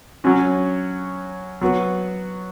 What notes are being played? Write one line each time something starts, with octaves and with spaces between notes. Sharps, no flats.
F#3 C#4 F#4
F#3 B3 F#4